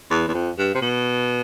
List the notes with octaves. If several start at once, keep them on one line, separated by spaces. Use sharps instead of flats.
E2
E2
F2
G2
C3
B2